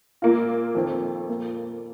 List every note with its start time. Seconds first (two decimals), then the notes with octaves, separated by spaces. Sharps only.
0.22 A#2 A#3 F4
0.75 F2 D#3 C4
1.28 A#2 A#3 F4